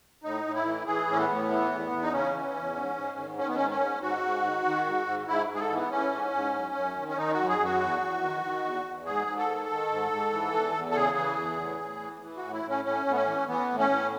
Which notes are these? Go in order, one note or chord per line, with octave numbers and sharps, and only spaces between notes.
A2 D#4
A2
E4
E3
E3 G#4
A2 C#4
B3
A2
E3
E2
E2
D#4
C#3 C#4
E3
E2
G#2
G#2
D#3
D#3 C#4
B3
G#2 C#4
C#4
G#2
G#2 F#4
G#2
D#3
D#3
G#2
G#2
G#2 E4
G#2
G#4
A4
E3
B3
E3 C#4
G#2
G#2
F#2
F#2
D#3
C#4
D#3 D#4
F#2 F#4
G#4
F#2
F#4
E2
E2
D#3
D#3
E2
E2
G#2 G#4
G#2
A4
D#3
D#3
G#2
G#2
E3
E2
E2
A4
C#3 G#4
E3
E2
A2
A2
E3
E3
A2 F#4
E4
A2 C#4
A2 C#4
A2
B3
C#4
E3
E3 B3
A2
C#4
A2